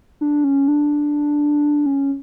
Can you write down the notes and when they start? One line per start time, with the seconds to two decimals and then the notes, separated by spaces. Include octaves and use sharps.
0.21 D4
0.44 C#4
0.68 D4
1.86 C#4